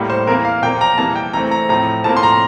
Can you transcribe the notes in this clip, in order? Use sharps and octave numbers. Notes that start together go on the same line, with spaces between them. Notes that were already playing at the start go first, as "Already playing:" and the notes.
Already playing: A2 G3 A#3
C5
E3 A#3 A#4
F5
A#2 F3 A#3 G5
A#5
E3 G3 A#3 A5
G5
E3 A3 C4 A#5
A#5
A2 F3 C4 A#5
A2 F3 A#3 A5
C6
A#5